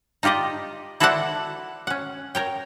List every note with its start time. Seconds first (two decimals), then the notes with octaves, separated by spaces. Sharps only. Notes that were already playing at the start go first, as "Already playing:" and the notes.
0.23 D#4 F4 G4 D5 D#5
1.00 E4 F#4 A4 C5 D5 F#5
1.87 C#4 F#5
2.35 A#4 C#5 G5